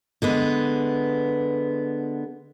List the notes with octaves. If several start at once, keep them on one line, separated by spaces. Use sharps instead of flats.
D3 G#3 B3